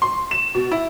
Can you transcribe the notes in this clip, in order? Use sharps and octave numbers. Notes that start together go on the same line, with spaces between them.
C6
E7
B2
E4